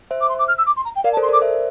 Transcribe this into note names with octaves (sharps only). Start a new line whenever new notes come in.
C5 E5
D6
C6
D6
F6
E6
D6
C6
A#5
G5
A#4 D5 F5
A5
A4 C5
C6
A#4 D5
D6
C5 E5